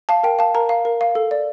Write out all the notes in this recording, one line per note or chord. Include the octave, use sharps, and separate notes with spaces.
F5 A5
A#4 G5
F5 A5
A#4 A#5
F5
A#4
F5
A4
D5